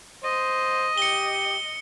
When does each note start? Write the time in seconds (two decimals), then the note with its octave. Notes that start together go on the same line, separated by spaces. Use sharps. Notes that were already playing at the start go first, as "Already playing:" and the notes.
0.23 C5 D#5
0.98 G4 C#7 G7